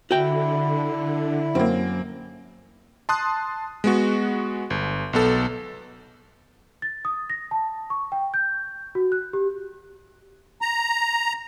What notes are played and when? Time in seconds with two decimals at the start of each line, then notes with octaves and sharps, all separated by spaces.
0.11 D3 E4 F#4 G5
1.55 F#2 A#3 C4
3.09 A5 C6 D#6 F#6
3.84 G#3 B3 F#4
4.70 G1
5.13 B1 B3 A4
6.82 A6
7.05 D#6
7.30 A#6
7.51 A5
7.90 C#6
8.12 G5
8.34 G6
8.95 F#4
9.12 F#6
9.33 G4
10.62 A#5